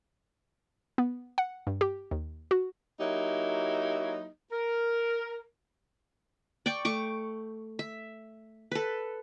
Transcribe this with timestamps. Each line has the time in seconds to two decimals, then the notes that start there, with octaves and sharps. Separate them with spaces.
0.98 B3
1.38 F#5
1.67 G2
1.81 G4
2.11 D#2
2.51 F#4
3.00 F#3 A#3 D#4 E4 G4
4.52 A#4
6.66 D5 G5 C#6 D6
6.85 A3 C#6 D6
7.79 E5
8.72 A4 B4